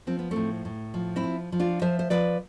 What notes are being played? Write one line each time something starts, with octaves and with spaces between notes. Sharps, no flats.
F3 C4
B3
A2 A3 C4
A2
F3
C4 E4
F3
F3
D4 F4
F3 C5 E5
C5
F3 B4 D5